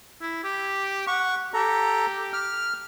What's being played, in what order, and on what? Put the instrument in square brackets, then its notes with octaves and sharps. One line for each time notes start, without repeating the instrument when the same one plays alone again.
[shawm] E4
G4
[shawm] F#5 [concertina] C#6
[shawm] G4 [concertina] A4 A#5
[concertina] F6